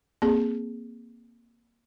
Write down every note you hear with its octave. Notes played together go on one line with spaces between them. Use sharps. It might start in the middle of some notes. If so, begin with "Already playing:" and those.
A#3 C4 G#4